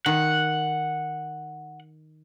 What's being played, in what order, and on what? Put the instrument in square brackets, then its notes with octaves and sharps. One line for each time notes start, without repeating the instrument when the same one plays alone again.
[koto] D#3 [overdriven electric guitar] F#5